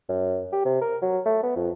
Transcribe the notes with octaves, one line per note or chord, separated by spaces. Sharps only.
F#2
G4
C3
A#4
F#3
A3
B3
F2